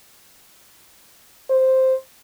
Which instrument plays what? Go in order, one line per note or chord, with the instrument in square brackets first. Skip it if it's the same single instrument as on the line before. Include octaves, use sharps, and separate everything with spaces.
[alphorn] C5